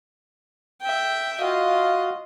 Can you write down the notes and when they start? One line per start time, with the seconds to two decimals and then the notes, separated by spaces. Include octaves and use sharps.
0.81 E5 G5
1.40 F4 F#4 D#5 F5